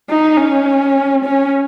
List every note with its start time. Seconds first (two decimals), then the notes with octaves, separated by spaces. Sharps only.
0.09 D#4
0.37 C#4
1.24 C#4